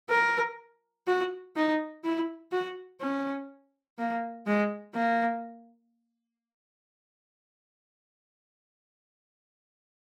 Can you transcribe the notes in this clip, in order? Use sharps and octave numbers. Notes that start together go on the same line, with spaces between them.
A#4
F#4
D#4
E4
F#4
C#4
A#3
G#3
A#3